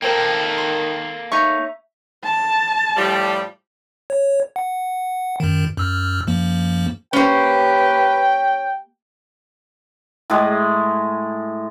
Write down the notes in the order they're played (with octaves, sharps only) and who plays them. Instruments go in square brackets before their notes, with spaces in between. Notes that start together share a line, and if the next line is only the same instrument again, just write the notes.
[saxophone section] D#3 [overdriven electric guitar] A#3 A4 [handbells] A#4 C5 G5
[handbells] C6
[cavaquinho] D#4 C#5 C#6 [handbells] E5
[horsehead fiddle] A5
[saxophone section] A2 F3 G3
[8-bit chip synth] C#5
F#5
F#2 D#3
F#2 E6 F6
F#2 F3 A#3
[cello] A#3 G4 [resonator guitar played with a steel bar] C#4 C5 [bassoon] B4 [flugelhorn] G5
[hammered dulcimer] A2 G#3